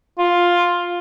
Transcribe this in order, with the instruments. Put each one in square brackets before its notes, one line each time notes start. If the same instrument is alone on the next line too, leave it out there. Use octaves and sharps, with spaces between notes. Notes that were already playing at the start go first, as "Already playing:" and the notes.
[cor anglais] F4